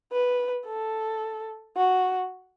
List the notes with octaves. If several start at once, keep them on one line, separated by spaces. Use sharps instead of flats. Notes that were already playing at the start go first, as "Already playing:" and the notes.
B4
A4
F#4